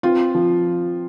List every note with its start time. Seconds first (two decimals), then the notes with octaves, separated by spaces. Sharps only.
0.03 C4 F4
0.35 F3